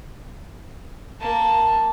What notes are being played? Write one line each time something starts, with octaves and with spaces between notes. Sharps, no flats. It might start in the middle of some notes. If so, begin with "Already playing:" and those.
A#3 A5